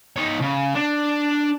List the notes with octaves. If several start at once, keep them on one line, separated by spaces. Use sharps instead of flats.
D#4 C#5
C#3
D4